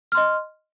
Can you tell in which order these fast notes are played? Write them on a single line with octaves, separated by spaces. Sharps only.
F6 C6 D#5